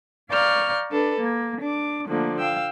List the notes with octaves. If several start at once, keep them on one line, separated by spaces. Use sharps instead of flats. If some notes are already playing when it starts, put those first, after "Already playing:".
D5 F5 A#5 C#6 F6 G6
D4 A4 B4
A#3
D4 D6
D3 F3 A3 A#3
F5 G5 E6